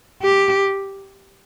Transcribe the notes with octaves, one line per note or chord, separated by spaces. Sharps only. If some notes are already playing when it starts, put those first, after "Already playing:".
G4